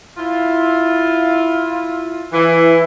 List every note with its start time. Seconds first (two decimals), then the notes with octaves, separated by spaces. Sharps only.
0.17 E4 F4
2.32 E3